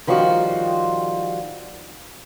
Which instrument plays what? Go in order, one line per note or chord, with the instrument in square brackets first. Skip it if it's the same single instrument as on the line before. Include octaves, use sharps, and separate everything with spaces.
[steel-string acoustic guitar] D#3 F3 G3 F4 F#4